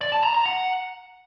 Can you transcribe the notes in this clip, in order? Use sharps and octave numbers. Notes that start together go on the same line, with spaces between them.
D5
A5
A#5
A#5
F#5